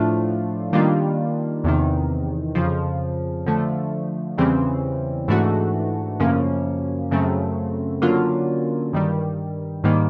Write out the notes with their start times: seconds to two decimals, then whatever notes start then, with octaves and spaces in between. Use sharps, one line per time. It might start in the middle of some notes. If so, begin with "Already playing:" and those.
Already playing: A2 F3 A3 D4 F4
0.73 D#3 G3 A#3 D4 F4
1.64 E2 C3 D#3
2.55 F2 C#3 F3
3.46 D3 F3 A3
4.38 E2 C#3 E3 G3 C4
5.28 G#2 E3 A3 D4 F#4
6.20 F#2 C#3 F3 A#3 C#4
7.11 F#2 C#3 F#3 A3 C4
8.02 D3 F#3 A#3 C#4 F4
8.93 G2 D#3 G3
9.84 G#2 D#3 G3 A#3